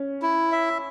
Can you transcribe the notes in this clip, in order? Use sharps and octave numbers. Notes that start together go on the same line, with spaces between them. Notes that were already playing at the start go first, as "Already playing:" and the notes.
Already playing: C#4
E4
E5